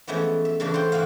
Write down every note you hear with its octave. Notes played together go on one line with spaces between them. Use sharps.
E3 F3 G#3 A3 B3 C#4
E5
C#3 E3 A3 A#3 D4
C5 F#5 G5
E3 F4 F#4 F5